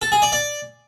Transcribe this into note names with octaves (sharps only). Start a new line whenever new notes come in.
A4
G#4
D5
D5